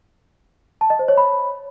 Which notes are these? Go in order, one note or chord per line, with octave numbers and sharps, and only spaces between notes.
A5
D#5
C5
C#5
B5